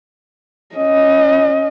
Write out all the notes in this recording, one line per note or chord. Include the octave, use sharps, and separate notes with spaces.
C#4 D#5